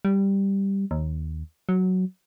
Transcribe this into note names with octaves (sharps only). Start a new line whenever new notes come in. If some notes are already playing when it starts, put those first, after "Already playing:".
G3
D#2
F#3